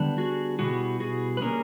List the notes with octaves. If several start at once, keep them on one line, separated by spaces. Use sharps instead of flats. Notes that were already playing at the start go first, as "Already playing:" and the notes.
Already playing: D3 G3 B3 D4
F#4 G#4
B2 G3 B3 E4 F#4 G#4
F#4 G#4
B4
D3 G3 A#3 C#4 G#4 A#4